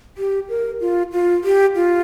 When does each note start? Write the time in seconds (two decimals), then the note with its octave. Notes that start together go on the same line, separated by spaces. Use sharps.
0.18 G4
0.49 A#4
0.81 F4
1.12 F4
1.44 G4
1.76 F4